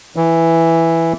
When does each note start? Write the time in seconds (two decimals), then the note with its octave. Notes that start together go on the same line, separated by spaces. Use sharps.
0.16 E3